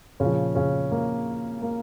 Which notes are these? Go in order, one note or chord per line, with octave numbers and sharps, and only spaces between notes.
A#2 C#3 F3 C#4
C#3 C#4
A#3
A#3